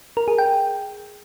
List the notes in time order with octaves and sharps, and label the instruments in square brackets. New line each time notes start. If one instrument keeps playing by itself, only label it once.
[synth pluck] A#4
G#4
G5